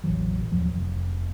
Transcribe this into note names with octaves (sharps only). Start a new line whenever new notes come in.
E1 A1 E3 F#3
D#2 F3 F#3
F1